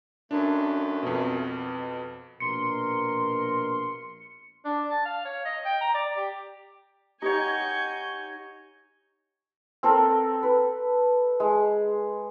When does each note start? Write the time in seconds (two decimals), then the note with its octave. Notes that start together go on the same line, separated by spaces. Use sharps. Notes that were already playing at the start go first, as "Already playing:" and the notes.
0.31 F#2 D#3 A3 D4
1.03 F2 B2
2.40 A#1 B2 A#4 C6 C#7
4.65 D4
4.90 A5
5.05 F5
5.25 C#5
5.45 D#5
5.65 G5
5.81 A#5
5.94 D5
6.17 G4
7.22 D#4 G4 C#5 D#5 F#5 G#5 C#6 G6
9.83 C4 A4 A#4
10.43 B4
11.40 G#3